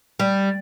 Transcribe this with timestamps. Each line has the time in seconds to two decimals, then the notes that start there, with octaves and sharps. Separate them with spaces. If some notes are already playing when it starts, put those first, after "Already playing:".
0.20 G3